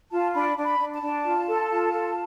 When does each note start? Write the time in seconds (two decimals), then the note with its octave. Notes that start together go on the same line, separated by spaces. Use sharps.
0.11 F4 A5
0.34 D4 B5
0.57 D4
0.64 B5
0.80 D4
0.94 A5
1.02 D4
1.25 F4
1.48 A4
1.70 F4
1.93 A4